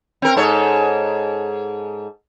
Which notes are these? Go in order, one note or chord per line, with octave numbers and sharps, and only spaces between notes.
C4 A#4
G#2 A4 C#5